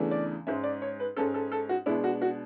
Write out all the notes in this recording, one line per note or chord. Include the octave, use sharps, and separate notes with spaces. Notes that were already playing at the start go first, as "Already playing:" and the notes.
Already playing: E2 C#3 E3 A3 D4
D5
G#2 G#3 C#4 E5
D5
C#5
B4
G#2 G#3 C#4 A4
A4
A4
F#4
B2 G#3 D4 E4
F#4
F#4